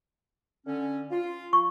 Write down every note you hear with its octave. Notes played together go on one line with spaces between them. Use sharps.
D3 C#4
F4
C#6